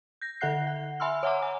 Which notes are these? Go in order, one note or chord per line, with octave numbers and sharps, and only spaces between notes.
G6 A#6
D3 A4 E5 F#5 F#6 C7
F#5
E5 G#5 B5 C6 E6 F6
C#5 E5 F#5 G#5 A#5 D6
G#5